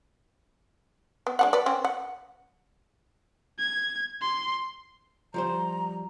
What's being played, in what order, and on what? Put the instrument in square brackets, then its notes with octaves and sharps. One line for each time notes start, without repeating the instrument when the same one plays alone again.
[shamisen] B3
G#3 D4 F#5
B4 D5
C4 C#4
F#5
[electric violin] G#6
C6
[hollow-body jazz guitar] F3 G3 C5 [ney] A#5